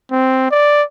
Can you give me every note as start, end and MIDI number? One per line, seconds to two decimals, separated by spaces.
0.11 0.47 60
0.51 0.82 74